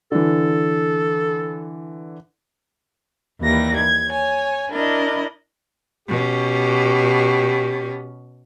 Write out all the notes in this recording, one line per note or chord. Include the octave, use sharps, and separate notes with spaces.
D3 E3 A4
D#2 E3 G3 A#6
G#6
C#5 G#5
D4 E4 A#4 D#5
B2 C#4 G4